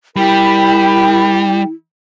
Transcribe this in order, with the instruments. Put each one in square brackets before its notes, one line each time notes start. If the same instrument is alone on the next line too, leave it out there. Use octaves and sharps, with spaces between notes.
[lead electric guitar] G3 [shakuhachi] E4 [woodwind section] A#4 B5 [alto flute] G5